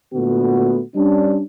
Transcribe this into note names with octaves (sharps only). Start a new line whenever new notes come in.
A#2 D3 A3 B3 F#4
G3 C#4 D4